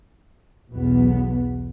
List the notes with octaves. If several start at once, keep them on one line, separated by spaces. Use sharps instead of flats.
B1 E2 B3